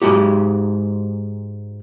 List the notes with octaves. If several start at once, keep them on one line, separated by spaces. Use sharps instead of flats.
G#2 F#3 G#3 F#4 G4